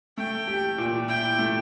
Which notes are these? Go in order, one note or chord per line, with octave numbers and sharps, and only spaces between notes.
A3 G5
G4
A#2
E4 G5
A3